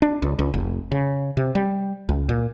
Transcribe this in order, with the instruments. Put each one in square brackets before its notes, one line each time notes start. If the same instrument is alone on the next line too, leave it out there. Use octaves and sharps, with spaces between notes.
[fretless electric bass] D4
C#2
C#2
F1
C#3
C3
G3
C#2
A#2